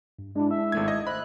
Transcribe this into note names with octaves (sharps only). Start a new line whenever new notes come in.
G2
G#3 D4 E4
E5
G#1 A3 G#6
D#5
C5 D#5 B5 F#6